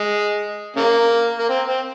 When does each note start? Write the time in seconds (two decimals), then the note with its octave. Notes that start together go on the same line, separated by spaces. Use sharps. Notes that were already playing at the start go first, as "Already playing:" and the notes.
Already playing: G#3
0.76 C#3 A#3
1.39 A#3
1.49 C4
1.68 C4